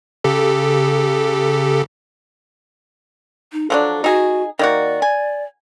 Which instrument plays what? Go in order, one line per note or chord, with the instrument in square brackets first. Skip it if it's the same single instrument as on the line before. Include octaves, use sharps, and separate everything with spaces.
[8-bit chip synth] C#3 G4 A4
[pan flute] D#4
[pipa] F3 F#3 D4 [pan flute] A4
[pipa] D#4 G#4 [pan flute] F#4
[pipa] D#3 A#3 F#4 [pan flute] D5
[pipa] G#5